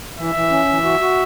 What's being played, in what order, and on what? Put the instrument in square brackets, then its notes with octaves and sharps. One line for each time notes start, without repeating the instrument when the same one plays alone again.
[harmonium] E3 [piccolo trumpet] E5
[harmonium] E3
C#4
E3
F#4
F#4